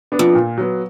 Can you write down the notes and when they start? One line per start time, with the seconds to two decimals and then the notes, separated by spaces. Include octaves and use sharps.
0.12 B3 D4
0.19 F2
0.35 A#2
0.58 F#3 B3